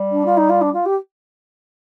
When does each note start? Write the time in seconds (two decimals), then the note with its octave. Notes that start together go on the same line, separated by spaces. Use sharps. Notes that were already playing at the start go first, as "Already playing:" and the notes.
Already playing: G3
0.12 D4
0.25 F4
0.37 D#4
0.49 F4
0.61 D4
0.73 F4
0.85 G4